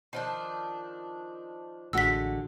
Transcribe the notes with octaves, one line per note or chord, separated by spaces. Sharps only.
D#3 F3 D4
A1 D3 G#3 F#4 E6 B6